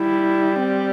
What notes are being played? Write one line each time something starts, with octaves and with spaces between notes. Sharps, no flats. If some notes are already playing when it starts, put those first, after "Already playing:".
Already playing: G3 E4
C4